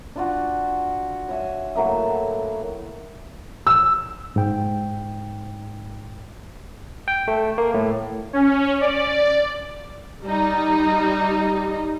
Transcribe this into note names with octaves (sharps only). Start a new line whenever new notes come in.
D4 F4 F#4
C#5 E5 G#5
A2 F#3 A#3 E5
E6
G#2 G5
G5
A3
A#3
A2
C#4
D5
G3 D#4